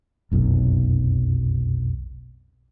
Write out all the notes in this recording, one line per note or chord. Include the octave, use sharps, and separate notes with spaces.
F1 B1 F#2